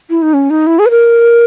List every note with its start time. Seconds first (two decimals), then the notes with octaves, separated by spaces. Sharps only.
0.10 E4
0.22 D#4
0.34 C#4
0.50 D#4
0.67 E4
0.79 G#4
0.86 B4
0.90 A#4